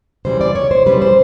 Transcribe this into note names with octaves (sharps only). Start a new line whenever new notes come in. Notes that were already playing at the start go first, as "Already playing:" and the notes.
C#3 E3 G3 C5
D5
C#5
C5
C#3 E3 G3 B4
C5